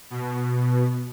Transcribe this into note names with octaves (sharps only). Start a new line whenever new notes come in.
B2